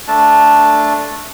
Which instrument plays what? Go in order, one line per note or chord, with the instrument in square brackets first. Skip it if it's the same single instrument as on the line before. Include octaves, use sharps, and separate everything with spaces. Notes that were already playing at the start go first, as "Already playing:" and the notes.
[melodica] A3 D4 A5